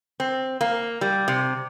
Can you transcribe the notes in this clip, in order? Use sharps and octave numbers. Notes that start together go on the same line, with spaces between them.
C4
A#3
G3
C3